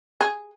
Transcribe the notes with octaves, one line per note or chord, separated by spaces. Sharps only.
G#4